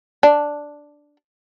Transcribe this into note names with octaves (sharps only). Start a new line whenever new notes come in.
D4